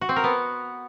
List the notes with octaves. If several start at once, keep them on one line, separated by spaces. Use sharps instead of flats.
F#4
C4
A#4
B3